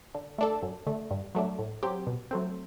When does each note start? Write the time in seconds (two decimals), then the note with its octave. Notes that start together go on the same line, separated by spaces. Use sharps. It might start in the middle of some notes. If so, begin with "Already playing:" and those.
0.15 D3
0.38 A3 D4 A4
0.62 F#2
0.87 D3 A3
1.11 G2
1.35 F#3 A3 D4
1.59 A2
1.83 F#3 C4 G4
2.07 B2
2.31 F#3 A3 C4